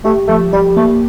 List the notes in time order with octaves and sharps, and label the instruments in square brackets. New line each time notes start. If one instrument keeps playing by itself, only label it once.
[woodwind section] A3 [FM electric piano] G4
[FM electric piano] F3 [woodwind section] A3
[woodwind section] G3 [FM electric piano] G4
[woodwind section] A3 [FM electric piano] A#3